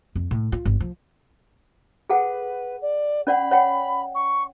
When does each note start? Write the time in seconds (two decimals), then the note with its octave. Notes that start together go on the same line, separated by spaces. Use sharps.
0.15 F2
0.31 A2
0.52 F4
0.65 G1
0.80 F3
2.10 G#4 A4 B4 F#5
2.81 D5
3.27 C#4 D5 F#5 B5
3.51 C#5 F#5 G5
4.15 C#6